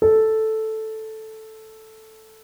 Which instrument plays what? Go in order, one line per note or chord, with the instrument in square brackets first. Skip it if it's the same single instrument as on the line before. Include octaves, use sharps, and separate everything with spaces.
[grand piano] A4